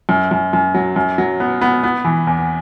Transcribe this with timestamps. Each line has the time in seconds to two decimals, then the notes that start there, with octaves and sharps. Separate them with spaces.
0.09 F#2
0.31 F#2
0.53 F#2
0.74 F#3
0.96 F#2
1.18 F#3
1.40 B3
1.61 B3
1.84 B3
2.05 E3
2.27 E2